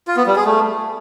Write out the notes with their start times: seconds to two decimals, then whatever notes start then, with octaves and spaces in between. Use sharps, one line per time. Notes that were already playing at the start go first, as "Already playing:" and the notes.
0.08 F4
0.17 B3
0.26 G3
0.36 G#4
0.45 A3